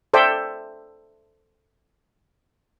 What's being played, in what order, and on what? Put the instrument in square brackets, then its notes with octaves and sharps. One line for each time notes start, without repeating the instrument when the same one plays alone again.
[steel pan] A4 C5 D5 E5 G5